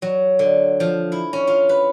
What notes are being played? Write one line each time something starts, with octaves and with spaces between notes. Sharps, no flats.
F#3
D3
F3
E4
C#4
F4
B4